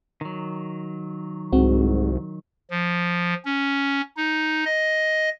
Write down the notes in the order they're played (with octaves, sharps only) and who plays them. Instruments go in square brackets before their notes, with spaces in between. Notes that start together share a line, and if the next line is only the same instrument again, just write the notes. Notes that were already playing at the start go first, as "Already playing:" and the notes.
[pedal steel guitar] D#3 F#3
[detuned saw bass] C2 [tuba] G#2 [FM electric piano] C4 F#4
[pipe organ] F3
C#4
D#4
D#5